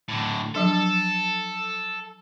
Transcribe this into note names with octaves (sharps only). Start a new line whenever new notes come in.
A2 D3
F3 F#3 D4 A4